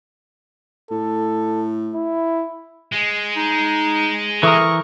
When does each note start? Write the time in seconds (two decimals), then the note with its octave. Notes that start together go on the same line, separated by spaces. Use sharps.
0.91 A2 A4
1.94 E4
2.92 G#3
3.36 D#4
4.43 E3 A4 A#4 E5 C#6 D#6